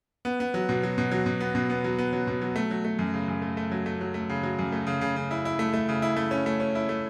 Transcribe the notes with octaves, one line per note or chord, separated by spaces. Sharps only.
B3
B3
F#3
B2
F#3
B2
F#3
B2
B3
B2
B3
F#3
B3
F#3
B2
F#3
A3
F#3
A3
F#2
C#3
F#2
A3
A3
F#3
A3
F#3
A3
C#3
F#3
F#2
A3
C#3
C#3
C#3
E4
E4
A3
A3
C#3
E4
A3
C#4
A3
C#4
E4
A3